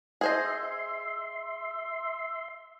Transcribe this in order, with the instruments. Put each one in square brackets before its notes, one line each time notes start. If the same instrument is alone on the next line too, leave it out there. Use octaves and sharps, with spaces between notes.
[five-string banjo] G#4 C5 D#5 [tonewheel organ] E5 C6